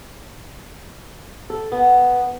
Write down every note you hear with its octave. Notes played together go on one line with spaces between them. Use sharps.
A4
B3